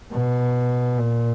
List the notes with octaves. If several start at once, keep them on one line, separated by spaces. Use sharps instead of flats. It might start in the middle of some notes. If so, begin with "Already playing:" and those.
B2
A#2